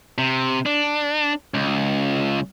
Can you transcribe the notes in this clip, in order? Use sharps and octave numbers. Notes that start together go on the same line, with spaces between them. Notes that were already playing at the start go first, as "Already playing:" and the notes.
C3
D4
C#2